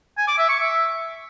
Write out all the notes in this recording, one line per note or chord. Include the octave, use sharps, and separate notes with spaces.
G#5
D6
E5
C#6
E5